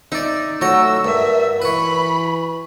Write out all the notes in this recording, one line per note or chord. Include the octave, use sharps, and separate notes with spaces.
D#4 D5 E5
F#3 A3 C#5 A#5 E6
G2 A#4 E5
E3 B4 C#5 B5